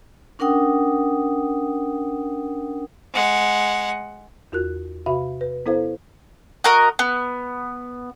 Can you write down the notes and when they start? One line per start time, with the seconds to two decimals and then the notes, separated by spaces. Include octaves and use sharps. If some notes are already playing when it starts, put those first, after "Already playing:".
0.39 C#4 D4 A#4 F#5 G5 D#6
3.13 G#3 F#5
4.52 E2 F4 F#4 A#4 F#6
5.06 C3 F#4 E5 F5 B5
5.41 B4
5.66 B3 E4 A4 C5 F5
6.64 F#4 A#4 D#5
6.99 B3